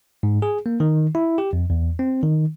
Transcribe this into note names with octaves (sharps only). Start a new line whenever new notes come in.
G#2
G#4
A#3
D#3
E4
G4
F2
E2
C4
D#3